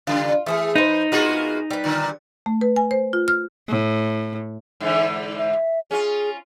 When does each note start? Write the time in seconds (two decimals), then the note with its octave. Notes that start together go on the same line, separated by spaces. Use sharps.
0.07 C#3 G3 F4
0.46 E3 A3 G#4 A4
0.76 D#4 B4 C5
1.12 C3 G#3 A#3 B3 F4 F#4
1.70 G3 B4
1.84 A#2 D3
2.46 A3
2.61 B4
2.76 G#5
2.91 C5
3.13 F4
3.28 F6
3.69 A2
4.81 G#2 D3 E3
5.38 E5
5.91 C#4 F4 G#4